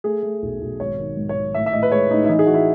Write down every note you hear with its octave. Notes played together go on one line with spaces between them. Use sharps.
A3 G#4
A3
B1
B1
G#1 C#5
D#3
G#2
C#5
D#3
A2 E5
E5
A2 D#5
B4
G#3 C#5
A2 D#4
E4
E3 D#4
G#4
E3 F#4
E4